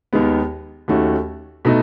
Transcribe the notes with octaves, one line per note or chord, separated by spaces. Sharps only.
D#2 D#3 G#3 B3
D#2 D#3 A3 C#4 F#4
B2 A3 D#4